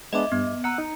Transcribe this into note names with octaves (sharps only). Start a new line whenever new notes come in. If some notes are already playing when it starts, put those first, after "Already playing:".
G#3 B3 D4 D#5 E5 D6
G2 B3
F#5 A#5 E6 F#6 C#7
D#4